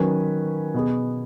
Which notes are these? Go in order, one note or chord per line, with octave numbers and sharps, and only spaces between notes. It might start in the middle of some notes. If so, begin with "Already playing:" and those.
Already playing: D#3 F#3 C#4 B4
B2 B3 G#4